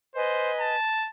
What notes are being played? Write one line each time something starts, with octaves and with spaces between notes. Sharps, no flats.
B4 C5 D#5 G#5
A5